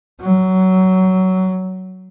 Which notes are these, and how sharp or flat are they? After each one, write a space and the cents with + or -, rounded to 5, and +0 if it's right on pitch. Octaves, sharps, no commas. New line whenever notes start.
F#3 +15